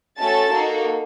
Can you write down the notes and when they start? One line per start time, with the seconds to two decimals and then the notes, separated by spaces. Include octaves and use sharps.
0.19 A3 C#4 F#4 A4 A5 A6
0.52 A#3 D#4 F#4 A4